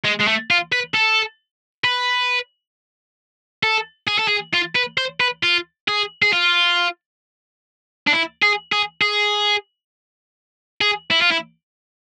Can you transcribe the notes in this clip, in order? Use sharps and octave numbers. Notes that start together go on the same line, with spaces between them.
G#3
G#3
A3
F4
B4
A4
B4
A4
G#4
A4
G#4
F4
B4
C5
B4
F4
G#4
G#4
F4
D4
E4
G#4
G#4
G#4
G#4
E4
F4
E4